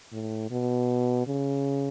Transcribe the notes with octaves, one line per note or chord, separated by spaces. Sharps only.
A2
B2
C#3